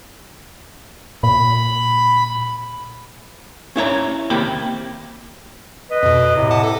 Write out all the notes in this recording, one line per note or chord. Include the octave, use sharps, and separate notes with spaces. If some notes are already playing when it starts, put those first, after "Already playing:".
A#2 B5
C#4 E4 C#5 A#5
D#2 C3 A#3 G4 G5 B5
B4 D#5
F2 B2
A2 C3
F#5 A5 D6
A4 D6